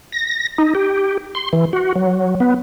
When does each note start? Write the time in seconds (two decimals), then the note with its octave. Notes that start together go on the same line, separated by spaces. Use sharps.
0.12 A#6
0.58 D#4
0.75 G4
1.35 C6
1.53 E3
1.73 F#4
1.96 F#3
2.40 B3